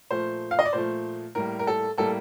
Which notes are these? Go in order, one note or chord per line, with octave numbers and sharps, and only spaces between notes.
A#2 F3 A3 C5
F5
D#5
D5
A#2 F3 A3 C5
A2 G3 A#3 A#4
A#4
A4
A2 G3 A#3 A4